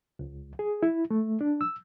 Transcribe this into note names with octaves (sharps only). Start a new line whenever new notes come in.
C#2
G#4
E4
A3
D4
E6